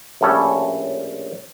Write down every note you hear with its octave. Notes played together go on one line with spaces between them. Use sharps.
A#1 A2 G3 C#4 A4 G#5